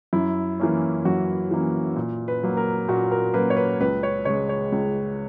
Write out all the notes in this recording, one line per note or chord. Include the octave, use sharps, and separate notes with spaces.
F#2 E4
E3 A#3 C#4
F#2 F#4
E3 A#3 C#4
A#2
B4
F#3 A#3
A#4
A#2 F#4
A#4
F#3 A#3 B4
C#5
B4
C#2 B4
C#5
C#3 G#3 C#5
C#5
C#2